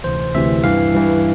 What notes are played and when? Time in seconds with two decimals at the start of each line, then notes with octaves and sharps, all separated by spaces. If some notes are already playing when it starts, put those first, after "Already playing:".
0.04 D2 C3 E3 C5
0.34 D2 C3 E3 E5
0.64 G2 E3 F5
0.95 G2 E3